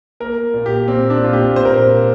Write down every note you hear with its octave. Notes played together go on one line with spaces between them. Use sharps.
A#3 A#4
A#3
A#2
G4
A#3
A#2 C4
A#3 D4
A#2 F4
G4
A#2
A#2 C5
A#4
A#2 C5
A#2